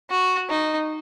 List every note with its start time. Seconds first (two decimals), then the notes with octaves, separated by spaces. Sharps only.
0.11 F#4
0.49 D#4